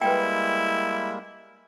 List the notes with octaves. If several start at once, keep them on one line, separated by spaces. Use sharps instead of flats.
G3 G#3 A#3 E4 B4 D5 G5